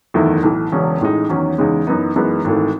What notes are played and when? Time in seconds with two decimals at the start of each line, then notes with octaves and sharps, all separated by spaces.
0.14 F#1 E2 D#3 A3 E4
0.43 B1 A2 E3
0.72 E1 E2 C#3 F#3 C#4
1.00 A1 A2 G#3 D#4
1.29 E2 D#3 F#3 C#4
1.58 E2 C#3 G#3 D#4
1.87 F#2 E3 B3 D#4
2.15 F#2 E3 G#3 B3 D#4
2.44 G#1 G#2 E3 A3